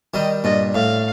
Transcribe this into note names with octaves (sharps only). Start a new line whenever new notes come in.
D#3 G3 D#5
G2 A#2 D#5
A2 F5